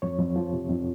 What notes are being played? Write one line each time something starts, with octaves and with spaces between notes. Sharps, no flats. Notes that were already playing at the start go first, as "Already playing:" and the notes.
F2 C#5
F2
F3
C3
F2